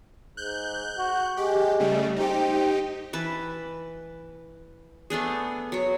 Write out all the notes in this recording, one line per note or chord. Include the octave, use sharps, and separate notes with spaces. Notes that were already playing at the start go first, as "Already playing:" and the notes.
G#2 F#6 G6
F#4
G#3 G4
C#3 G3 A3
C4 D#4 G4
E3 B4 A5
A3 B3 D4 G#4
F#3 C#5